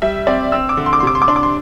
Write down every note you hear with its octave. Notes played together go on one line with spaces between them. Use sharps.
G3 E5
C4 D5
C4 E6
D6
D3
C6
D6
C6
C3 D6
C6
D6
D4 C6
D6
C6